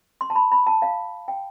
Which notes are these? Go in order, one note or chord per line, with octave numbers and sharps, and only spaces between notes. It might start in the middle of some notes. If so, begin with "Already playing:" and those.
C6
A5
B5
B5
A5
F5
G5